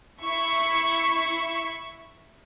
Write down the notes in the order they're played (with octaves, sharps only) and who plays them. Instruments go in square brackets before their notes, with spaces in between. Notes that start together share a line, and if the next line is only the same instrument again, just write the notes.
[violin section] E4 E5 C#6